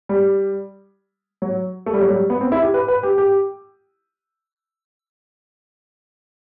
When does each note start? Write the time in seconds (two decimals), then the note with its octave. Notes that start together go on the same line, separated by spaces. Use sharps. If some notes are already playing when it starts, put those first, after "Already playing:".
0.09 G3
1.42 F#3
1.86 A3
1.94 G3
2.01 F#3
2.10 G3
2.30 B3
2.41 C4
2.52 E4
2.63 G4
2.74 B4
2.88 B4
3.03 G4
3.18 G4